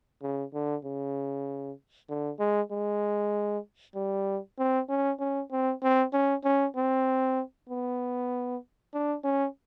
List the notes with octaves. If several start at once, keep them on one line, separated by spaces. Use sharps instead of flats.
C#3
D3
C#3
D3
G#3
G#3
G3
C4
C#4
C#4
C4
C4
C#4
C#4
C4
B3
D4
C#4